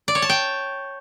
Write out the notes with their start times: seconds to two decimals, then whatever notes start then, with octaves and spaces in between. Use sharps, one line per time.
0.08 D5
0.15 C#5
0.22 A5
0.30 G5